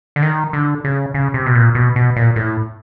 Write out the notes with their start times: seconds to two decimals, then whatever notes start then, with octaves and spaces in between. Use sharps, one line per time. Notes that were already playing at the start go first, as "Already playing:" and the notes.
0.16 D3
0.22 D#3
0.53 D3
0.85 C#3
1.14 C#3
1.34 C3
1.46 B2
1.55 A#2
1.75 B2
1.96 B2
2.16 A#2
2.36 A2